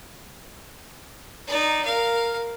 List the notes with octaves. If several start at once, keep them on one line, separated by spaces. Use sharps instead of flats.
D#4 D5
A#4 F5